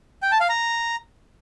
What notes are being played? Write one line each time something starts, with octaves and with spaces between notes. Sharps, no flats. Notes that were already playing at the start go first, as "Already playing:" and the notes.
G5
A5
F5
A#5